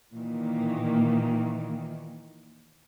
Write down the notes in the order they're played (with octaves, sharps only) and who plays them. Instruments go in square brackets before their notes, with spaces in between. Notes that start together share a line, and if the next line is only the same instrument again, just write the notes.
[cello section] A#2 D#3 E3 A#3